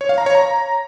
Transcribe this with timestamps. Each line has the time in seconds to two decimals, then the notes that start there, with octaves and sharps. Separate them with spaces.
0.01 C#5
0.09 F5
0.18 A#5
0.26 C#5
0.35 A#5